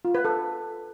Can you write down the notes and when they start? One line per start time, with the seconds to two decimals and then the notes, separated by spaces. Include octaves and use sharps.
0.05 F4
0.15 B4
0.25 A4